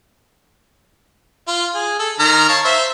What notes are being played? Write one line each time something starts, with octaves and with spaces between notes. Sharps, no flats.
F4
G#4
A4
D#3 A#5 F6
C#5 F5 A5
C5 E5